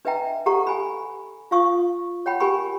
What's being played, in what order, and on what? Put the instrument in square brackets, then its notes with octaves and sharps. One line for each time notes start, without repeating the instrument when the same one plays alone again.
[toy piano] D4 B4 D#5 E5 G5 A#5
G4 A4 F#5 A#5 C#6
G#5 B5
F4 F5 C#6 D#6
C#5 F#5 G5 B5
G4 A#4 G#5 B5 C#6